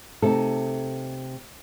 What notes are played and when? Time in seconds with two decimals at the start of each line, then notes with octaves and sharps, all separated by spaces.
0.22 C3 A3 D#4 A4